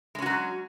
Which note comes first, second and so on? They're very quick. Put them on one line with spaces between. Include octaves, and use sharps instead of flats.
G#3 C#4 F#4 F#3